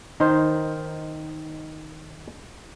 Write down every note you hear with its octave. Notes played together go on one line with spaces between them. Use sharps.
D#3 D#4 A#4 C5